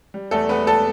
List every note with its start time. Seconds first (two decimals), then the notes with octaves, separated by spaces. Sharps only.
0.14 G3
0.31 E2 A3 A4
0.49 E2 B3 B4
0.67 A4 A5